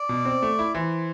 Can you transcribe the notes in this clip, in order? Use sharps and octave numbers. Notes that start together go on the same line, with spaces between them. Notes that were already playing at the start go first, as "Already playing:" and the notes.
Already playing: D5
B2
C4
A3
E4
E3 C5